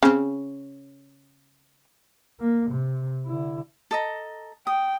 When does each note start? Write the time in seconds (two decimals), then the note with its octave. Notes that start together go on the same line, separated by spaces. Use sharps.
0.03 C#3 C4 C#4
2.40 A#3
2.71 C3
3.26 D3 E4
3.91 A4 D#5 A#5
4.67 G5 D#6